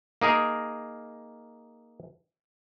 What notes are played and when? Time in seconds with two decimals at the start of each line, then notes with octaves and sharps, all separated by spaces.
0.22 A#3 D#4 G#4 A#4